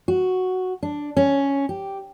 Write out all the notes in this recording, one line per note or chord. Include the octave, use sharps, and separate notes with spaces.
F#4
D4
C#4
G4